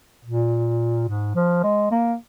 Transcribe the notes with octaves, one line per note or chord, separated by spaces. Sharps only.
A#2
G#2
F3
G#3
A#3